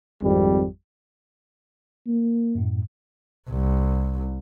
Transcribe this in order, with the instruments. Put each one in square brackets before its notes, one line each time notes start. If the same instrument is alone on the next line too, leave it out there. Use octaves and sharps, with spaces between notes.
[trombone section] G#1 F2 G3
[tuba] A#3
[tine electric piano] F#2 A2
[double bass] C2